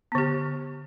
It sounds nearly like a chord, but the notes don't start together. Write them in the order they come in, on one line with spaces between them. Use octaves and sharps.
B3 D3 G4